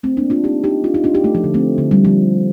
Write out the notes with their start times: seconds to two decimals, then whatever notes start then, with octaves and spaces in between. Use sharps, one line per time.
0.03 A3 C4
0.17 A#3 D4
0.30 D4 F4
0.44 D#4 G4
0.64 D#4 G4
0.84 D4 F4
0.94 D#4 G4
1.04 D4 F4
1.14 D#4 G4
1.24 A3
1.35 F3
1.44 D3
1.54 A3 C4
1.78 D3
1.91 G3
2.05 F3